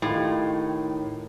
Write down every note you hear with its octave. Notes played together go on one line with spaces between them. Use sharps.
A2 D#3 F4 G4